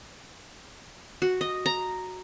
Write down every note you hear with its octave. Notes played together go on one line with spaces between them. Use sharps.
F#4
D#5
A#5